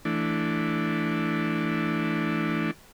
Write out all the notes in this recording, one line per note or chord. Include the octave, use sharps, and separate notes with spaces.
E3 A3 D4